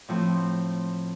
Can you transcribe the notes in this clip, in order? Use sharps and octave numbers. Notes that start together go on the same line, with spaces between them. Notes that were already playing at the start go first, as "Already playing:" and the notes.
A2 F3 A3 C4